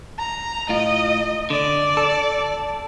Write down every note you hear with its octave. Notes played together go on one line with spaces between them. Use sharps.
A#5
A2 F4 D#5
D3 D5
A4